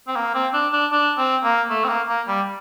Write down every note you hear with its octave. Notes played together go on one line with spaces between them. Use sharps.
C4
A#3
C4
D4
D4
D4
C4
A#3
A3
C4
A#3
A#3
G3